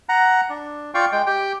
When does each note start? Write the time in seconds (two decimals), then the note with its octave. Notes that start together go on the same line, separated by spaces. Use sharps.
0.09 F#5 A#5
0.50 D4
0.94 F4 D5 F5 G5 C#6
1.12 G#3 G5
1.27 G4 G5